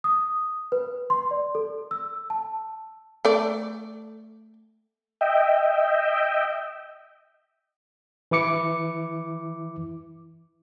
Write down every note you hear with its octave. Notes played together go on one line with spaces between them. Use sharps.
D#6
B4
C6
D5
A4
E6
A5
A3 D5
D#5 E5 G5
E3 E4 D6 C#7